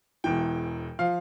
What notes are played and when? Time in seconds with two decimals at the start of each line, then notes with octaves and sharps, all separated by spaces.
0.24 E1 E2 E3 G5
0.99 F3 F5